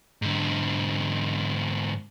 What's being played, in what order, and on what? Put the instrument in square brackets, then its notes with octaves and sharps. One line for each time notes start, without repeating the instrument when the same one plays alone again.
[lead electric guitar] G#2 D3